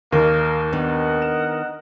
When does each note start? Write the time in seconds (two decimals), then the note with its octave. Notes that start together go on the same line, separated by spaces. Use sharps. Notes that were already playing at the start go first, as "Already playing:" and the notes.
0.13 D#2 A#3 D#4 A#4
0.73 D#3 B3 D4 A#4 D#5 F#5
1.22 E7